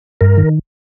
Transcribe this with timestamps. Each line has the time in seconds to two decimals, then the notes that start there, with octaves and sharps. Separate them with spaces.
0.21 G2 A#4
0.37 D#3